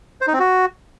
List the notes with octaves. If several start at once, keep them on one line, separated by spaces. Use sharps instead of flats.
C5
D#4
C4
F#4